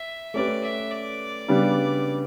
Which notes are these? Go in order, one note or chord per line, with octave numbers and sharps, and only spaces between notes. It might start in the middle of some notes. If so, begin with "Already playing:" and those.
Already playing: E5
A3 C#4 G4 B4 D5
E5
D5
C#3 G3 B3 D4